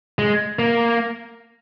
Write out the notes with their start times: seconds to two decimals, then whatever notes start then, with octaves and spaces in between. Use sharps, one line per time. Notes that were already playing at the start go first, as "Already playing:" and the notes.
0.19 G#3
0.59 A#3